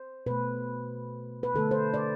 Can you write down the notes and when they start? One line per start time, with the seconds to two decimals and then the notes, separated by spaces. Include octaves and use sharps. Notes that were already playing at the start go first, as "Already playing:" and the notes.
Already playing: C5
0.26 B2 A3 B4
1.43 B4
1.54 D3 A3 A4
1.71 C5
1.94 D5